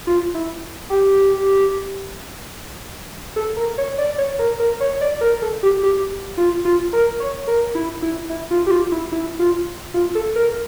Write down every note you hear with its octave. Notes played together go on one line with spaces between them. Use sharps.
F4
E4
G4
A4
A#4
C#5
D5
C#5
A#4
A#4
C#5
D5
A#4
A4
G4
G4
F4
F4
A#4
C#5
A#4
E4
E4
E4
F4
G4
F4
E4
E4
F4
F4
A4
A#4